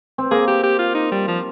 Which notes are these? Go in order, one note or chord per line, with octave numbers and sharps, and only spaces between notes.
C4
A#3 G#4
G4
G4
F4
D#4
G3
F3